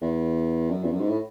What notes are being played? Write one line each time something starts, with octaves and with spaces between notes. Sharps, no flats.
E2
F#2
E2
F#2
G#2
A2